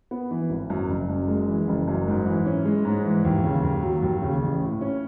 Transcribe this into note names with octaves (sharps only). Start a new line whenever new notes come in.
B3
E3
G#1
F#2
F#1
F#2
G#3
E3
F#1
F#2
G#2
E3
C#4
G#3
G#2
E3
D#2
C#3
D#2
F#3
D#2
C#3
A1
A2
C#4